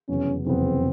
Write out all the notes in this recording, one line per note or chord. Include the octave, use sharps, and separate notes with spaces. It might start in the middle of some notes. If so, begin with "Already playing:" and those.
F1 E2 C#3 F#3 B3 C#4
F1 E2 C#3 F#3 B3 C4